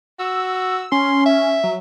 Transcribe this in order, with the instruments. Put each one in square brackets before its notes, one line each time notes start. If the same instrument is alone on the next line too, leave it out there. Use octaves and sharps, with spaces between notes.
[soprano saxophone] F#4 [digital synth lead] E6
[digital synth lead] C#4 [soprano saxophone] C6
[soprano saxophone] E5
[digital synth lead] F#3